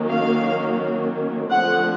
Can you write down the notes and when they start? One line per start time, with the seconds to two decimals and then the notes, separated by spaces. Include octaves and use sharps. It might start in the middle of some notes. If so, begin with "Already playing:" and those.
Already playing: D#3 F#3 A#3 C#4
0.09 F5
1.50 D3 F3 A3 C4 F#5